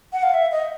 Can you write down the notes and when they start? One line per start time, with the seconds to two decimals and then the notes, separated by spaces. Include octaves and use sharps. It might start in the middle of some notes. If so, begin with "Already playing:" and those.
0.13 F#5
0.23 F5
0.34 E5
0.51 D#5